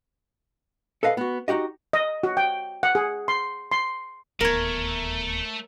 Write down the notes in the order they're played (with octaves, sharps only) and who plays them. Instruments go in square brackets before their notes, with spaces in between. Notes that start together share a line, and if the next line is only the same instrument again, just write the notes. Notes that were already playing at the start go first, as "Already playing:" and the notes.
[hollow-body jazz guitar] A4 B4 D#5 F5
B3 F#4
D#4 F#4 G4 D#5
[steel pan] D#5
F#4
G5
F#5
G#4
C6
C6
[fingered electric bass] D1 D#2 B3 [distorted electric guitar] A3 [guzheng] A#4 C#5